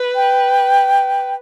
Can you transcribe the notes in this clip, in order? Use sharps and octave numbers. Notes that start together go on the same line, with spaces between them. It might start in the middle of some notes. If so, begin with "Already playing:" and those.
Already playing: B4
G5